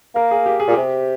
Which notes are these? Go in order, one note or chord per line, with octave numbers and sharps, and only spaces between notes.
A#3 A#4
G#4
G4
G#4
A#2
C3 G4